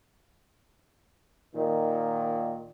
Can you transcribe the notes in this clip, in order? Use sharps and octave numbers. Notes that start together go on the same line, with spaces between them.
A#2 D#3